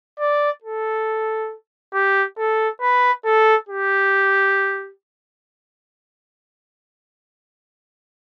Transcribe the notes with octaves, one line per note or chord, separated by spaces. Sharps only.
D5
A4
G4
A4
B4
A4
G4